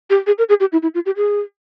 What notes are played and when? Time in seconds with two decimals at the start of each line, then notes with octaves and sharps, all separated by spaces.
0.10 G4
0.27 G#4
0.38 A#4
0.49 G#4
0.60 G4
0.72 E4
0.82 E4
0.94 F4
1.06 G4
1.16 G#4